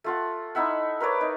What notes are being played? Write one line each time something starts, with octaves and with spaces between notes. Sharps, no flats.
A3 F4 F#5
D#4 E4 E5 F#5
A#4 B4 C#5 D5
D#4